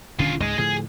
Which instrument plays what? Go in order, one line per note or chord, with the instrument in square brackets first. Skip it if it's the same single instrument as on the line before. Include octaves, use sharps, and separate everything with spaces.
[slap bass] D#1 D3 C#4 [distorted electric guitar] F4 G#4
[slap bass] C#2 G#2 [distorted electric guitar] G#4 D#5
[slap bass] A2 D3 F3 [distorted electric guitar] G#4